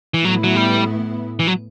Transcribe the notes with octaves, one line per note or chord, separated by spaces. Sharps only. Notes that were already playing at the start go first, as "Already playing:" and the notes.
E3
A2 E3 F#3 B3 E4
F#3
G3
E3
F#3